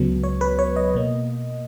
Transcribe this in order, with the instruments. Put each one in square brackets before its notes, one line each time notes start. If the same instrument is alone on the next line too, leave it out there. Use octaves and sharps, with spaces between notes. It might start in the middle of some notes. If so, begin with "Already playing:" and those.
Already playing: [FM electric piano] C#2 C#3 F#3 B3
C#5
B4
C#5
D#5
B2 A#3